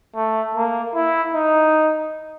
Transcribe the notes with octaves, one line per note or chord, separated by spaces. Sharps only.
A3
A#3
E4
D#4